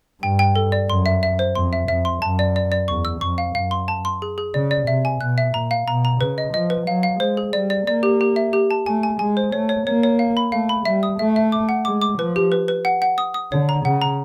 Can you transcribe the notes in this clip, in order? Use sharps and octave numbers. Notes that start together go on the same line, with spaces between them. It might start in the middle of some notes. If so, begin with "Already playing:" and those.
G2 G5
G5
A4
D5
F#2 C6
E5
E5
C5
F2 C6
E5
F2 E5
C6
F#2 A5
D5
D5
D5
E2 C#6
E6
F2 C#6
F5
F#2 F5
C6
A5
C6
G#4
G#4
C#3 D5
D5
C3 E5
G#5
B2 F#6
E5
A#2 A#5
F5
B2 A#5
A#5
C#3 B4
D#5
F3 D#5
B4
F#3 F5
F5
G#3 C5
G#4
G3 D5
D5
A#3 D5
G4
G4
E5
G4
A5
A3 G#5
G#5
G#3 G#5
C5
A3 C#5
C#5
A#3 C#5
C#5
F5
B5
A3 F5
B5
G3 E5
D#6
A3 E5
E5
D6
F#5
G#3 D6
D6
F3 B4
G4
B4
B4
F#5
F#5
D#6
D#6
D3 C#5
A#5
C#3 F#5
A#5